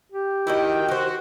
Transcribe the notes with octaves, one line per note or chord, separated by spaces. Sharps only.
G4
D#3 E4 F#4 D#5 G5
F#4 G4 C5